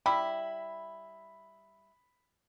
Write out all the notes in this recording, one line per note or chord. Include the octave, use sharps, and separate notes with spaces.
G3 E4 B5